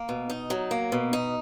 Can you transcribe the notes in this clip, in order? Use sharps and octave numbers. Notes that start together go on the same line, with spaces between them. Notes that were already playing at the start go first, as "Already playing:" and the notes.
Already playing: A#3
B2
D#4
F#3
A#3
B2
D#4